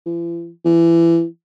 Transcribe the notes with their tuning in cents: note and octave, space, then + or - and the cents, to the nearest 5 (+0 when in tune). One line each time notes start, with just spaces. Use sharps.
E3 +45
E3 +25